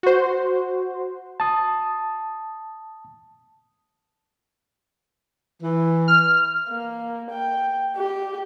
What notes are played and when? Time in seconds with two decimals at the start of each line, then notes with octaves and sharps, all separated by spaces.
0.03 F#4 C5
1.40 A5 D#6
5.63 E3
6.08 F6
6.69 A#3
7.30 G5
7.96 G4